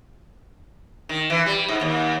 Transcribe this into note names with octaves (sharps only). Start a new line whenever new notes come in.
D#3
E3
G3
G#2
D#2